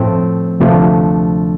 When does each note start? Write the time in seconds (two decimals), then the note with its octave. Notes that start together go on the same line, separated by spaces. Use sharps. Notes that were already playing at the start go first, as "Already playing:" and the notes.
Already playing: A2 F3 A3 C4
0.60 D2 C3 F3 A3 D4